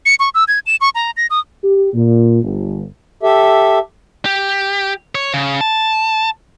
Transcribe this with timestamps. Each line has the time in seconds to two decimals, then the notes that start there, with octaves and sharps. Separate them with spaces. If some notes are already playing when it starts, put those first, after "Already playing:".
0.06 C#7
0.20 C#6
0.34 E6
0.48 G#6
0.66 E7
0.81 C#6
0.95 A#5
1.17 A#6
1.30 D#6
1.64 G4
1.94 A#2
2.43 G1
3.23 G4 A4 E5
4.25 G4
5.15 C#5
5.34 C#3
5.61 A5